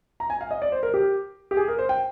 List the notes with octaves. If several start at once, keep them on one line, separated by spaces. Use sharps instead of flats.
A#5
G#5
F5
D#5
D5
C5
A#4
G4
G4
G#4
A#4
C5
G5